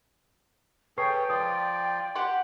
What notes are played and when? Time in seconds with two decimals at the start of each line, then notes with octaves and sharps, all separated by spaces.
0.98 G#4 A4 B4 C#5 G5 C#6 C7
1.30 F3 F4 D5 D#6
2.15 G4 F#5 C6